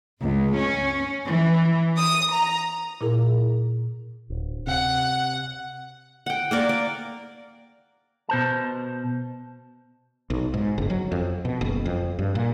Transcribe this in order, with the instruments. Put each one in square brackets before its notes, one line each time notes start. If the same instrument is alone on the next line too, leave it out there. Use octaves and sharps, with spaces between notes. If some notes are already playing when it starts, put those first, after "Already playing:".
[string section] C#2
C#4
E3
D#6
A#5
[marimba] A#2 E4 G#4 A#4
[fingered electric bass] D1
[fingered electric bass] C3 [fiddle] F#5
[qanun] F#5 G5
A#3 A#4 D5
D5
[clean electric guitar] B2 C5 A5
[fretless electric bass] B1
G#2
F#1
F#3
F2
B2
F#1
F2
G2
A#2